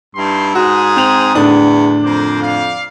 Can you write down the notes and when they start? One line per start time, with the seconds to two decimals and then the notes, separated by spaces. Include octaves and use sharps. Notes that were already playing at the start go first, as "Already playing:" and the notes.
0.15 G2 D#4 E4 C6
0.55 G#2 F#4 G#4 D#6
0.96 C4 F7 F#7
1.35 E2 A2 D3 D4
2.03 F2 A#4 C5 D6
2.41 D5 F5